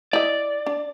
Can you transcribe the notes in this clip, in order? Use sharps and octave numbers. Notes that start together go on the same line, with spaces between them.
E4 D5 D#5
D4